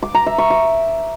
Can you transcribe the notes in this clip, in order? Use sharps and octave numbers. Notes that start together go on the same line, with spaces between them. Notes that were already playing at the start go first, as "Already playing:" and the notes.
D6
A#5
E5
C#6
D6